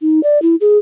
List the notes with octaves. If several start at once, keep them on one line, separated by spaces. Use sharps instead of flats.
D#4
D5
E4
G#4